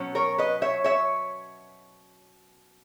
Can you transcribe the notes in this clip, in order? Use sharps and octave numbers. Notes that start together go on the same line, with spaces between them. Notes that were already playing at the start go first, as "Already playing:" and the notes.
Already playing: B2 F#3 C#4
A#4 C#5
B4 D#5
C#5 E5
C#5 E5